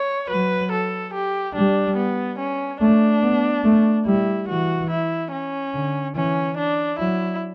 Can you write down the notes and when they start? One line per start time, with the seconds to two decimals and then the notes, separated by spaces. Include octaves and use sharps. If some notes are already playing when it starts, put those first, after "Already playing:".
Already playing: C#5
0.29 F#3 B4
0.72 A4
1.13 G4
1.55 G3 D4
1.96 B3
2.39 C#4
2.81 A3 D4
3.23 B3
3.64 A3
4.06 G3 E4
4.48 E3 F#4
4.90 E4
5.32 C#4
5.74 D3
6.16 E3 C#4
6.58 D4
6.99 F#3 E4